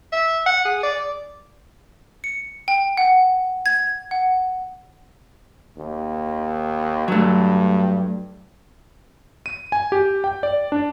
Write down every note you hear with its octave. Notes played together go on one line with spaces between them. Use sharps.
E5
F#5
G#4
D5
C#7
G5
F#5
G#6
F#5
D#2
G2 F#3 A3
D#7
G#5
G4
G5
D5
D4